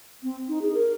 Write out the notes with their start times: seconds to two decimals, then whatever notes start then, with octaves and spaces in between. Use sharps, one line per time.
0.23 C4
0.49 D#4
0.62 G#4
0.74 A#4